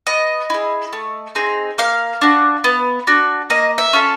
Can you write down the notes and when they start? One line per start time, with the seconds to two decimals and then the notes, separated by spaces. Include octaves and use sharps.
0.07 B3 D#5
0.50 E4 G#4
0.93 A3
1.35 C4 D#4 G#4
1.78 A#3 F5
2.21 D4 F#4
2.64 B3
3.07 D4 F#4
3.50 A#3 D#5
3.78 E5
3.93 C#4 F4 A4